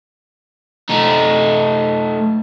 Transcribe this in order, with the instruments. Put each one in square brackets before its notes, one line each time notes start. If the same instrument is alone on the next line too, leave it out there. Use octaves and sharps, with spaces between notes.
[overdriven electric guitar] A3 D#4